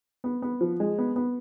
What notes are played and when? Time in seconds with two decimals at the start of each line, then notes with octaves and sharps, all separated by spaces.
0.24 B3
0.42 B3
0.61 F3
0.80 G#3
0.98 B3
1.16 B3